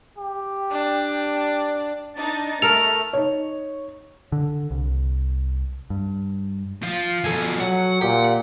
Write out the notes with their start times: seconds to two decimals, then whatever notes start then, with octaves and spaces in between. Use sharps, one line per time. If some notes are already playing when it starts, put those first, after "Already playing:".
0.18 G4
0.72 D4
2.16 D4 D#4 A6
2.62 A3 A4 A#4 F7
3.13 D#4 C#5
4.32 D3
4.71 C2
5.90 G2
6.83 F3
7.24 B2 F3 A4 G#5
7.60 F#3 F#5
8.01 A#2 G4